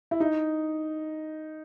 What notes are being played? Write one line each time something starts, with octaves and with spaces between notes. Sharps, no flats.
E4
D#4